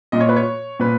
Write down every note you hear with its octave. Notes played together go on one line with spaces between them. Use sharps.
A#2 D#5
C#5
B4
C#5
A#2 B4